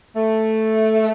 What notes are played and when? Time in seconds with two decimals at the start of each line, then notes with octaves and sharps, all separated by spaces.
0.15 A3